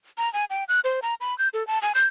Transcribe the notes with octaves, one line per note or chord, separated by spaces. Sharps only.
A#5
G#5
G5
F#6
C5
A#5
B5
G6
A4
A5
G#5
G6